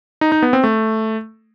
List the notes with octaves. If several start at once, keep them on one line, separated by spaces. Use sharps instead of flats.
D#4
D#4
B3
C4
A3